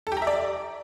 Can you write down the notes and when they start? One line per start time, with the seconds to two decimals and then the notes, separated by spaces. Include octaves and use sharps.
0.07 A4
0.12 G4
0.17 A#5
0.22 E5
0.27 D5